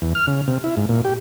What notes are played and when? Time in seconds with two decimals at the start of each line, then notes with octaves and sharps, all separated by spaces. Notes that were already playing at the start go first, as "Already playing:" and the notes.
0.02 E2
0.15 F6
0.27 C#3
0.48 C3
0.64 E4
0.77 G#2
0.89 A#2
1.05 G4